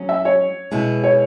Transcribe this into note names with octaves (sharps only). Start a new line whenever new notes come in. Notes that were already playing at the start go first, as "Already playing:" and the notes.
Already playing: F#3 C#4 G#4
E5
C#5
B2 G#3 E4 G#4
C#5